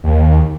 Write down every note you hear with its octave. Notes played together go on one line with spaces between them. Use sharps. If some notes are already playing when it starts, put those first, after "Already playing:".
D#2